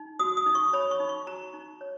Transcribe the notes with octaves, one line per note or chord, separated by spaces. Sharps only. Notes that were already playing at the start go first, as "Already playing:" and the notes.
Already playing: D#4
F#4 D#6
D#6
D#4
C#6
C#5 B5
C#6
D#4
C#6
F#4 A#5
D#4
C#5